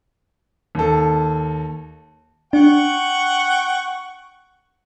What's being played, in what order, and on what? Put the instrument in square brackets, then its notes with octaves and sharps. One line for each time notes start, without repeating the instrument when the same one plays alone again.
[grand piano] D#2 A4
[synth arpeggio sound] D4 [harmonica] F#5 G5 C#6